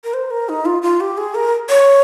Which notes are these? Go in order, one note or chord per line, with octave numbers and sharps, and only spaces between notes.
A#4
C5
A#4
D#4
F4
F4
G4
G#4
A#4
C#5